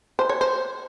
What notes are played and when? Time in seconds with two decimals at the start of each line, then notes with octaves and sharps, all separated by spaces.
0.19 C5
0.29 C#5
0.41 C5